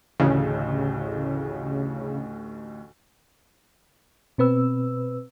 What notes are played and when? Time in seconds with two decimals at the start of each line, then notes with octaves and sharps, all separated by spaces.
0.20 A1 D2 A2 C#3
4.38 B2 C4 B4 E6